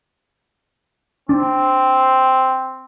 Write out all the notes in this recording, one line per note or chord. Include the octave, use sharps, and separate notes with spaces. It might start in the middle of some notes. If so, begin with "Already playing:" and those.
C4 D4